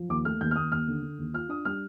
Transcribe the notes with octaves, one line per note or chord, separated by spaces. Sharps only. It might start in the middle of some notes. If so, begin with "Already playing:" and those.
Already playing: F3
D#2 D6
A3 F6
D#2 G6
F6
D#2 D#6
D#2 F6
D3
D3
D#2
F4 F6
D4 D#6
G3 F6